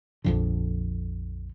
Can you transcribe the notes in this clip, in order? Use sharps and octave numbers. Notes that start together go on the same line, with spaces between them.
A#1 F2 D3